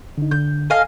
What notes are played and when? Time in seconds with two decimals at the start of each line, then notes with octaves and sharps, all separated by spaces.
0.18 D3 D#4
0.31 D3 G6
0.70 A4 D#5 F5 G#5 A5